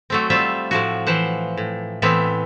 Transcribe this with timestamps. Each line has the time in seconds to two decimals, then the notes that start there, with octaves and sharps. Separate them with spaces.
0.10 F#3 A3 C4
0.30 G3 C4 F4 E5
0.71 A2 F3 F#4
1.07 E3 F3 C5 F#5
1.57 A2
2.02 A2 E3 B3 C4